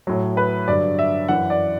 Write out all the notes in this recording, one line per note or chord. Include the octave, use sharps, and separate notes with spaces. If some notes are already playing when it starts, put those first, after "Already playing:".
A2 F#3
B4
G2 D3 F#3 D5
E5
F#2 E3 F#5
D5